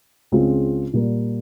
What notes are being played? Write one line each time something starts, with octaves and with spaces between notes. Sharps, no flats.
C#2 C#3 G#3 C4 F4
A#2 G3 A#3